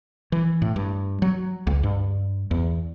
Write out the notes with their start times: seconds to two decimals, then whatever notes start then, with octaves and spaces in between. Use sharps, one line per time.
0.32 E3
0.62 A2
0.76 G2
1.22 F#3
1.67 C#2
1.83 G2
2.51 E2